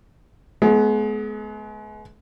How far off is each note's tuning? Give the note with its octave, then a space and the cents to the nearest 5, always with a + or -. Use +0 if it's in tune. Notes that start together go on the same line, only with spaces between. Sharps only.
G#3 +40 B3 +0